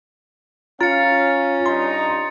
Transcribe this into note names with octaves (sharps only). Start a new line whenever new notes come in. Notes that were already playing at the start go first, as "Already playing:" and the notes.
C#4 F4 F5 A#5 A6 C#7
G2 D#4 A#5 C6